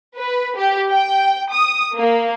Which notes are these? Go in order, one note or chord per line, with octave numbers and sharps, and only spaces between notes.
B4
G4
G5
D#6
A#3